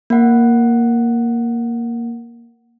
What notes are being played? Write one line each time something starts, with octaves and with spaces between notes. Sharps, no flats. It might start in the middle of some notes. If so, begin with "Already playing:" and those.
A#3 F#5